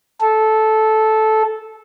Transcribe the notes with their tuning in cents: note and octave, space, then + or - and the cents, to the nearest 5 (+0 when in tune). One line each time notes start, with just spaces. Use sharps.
A4 -10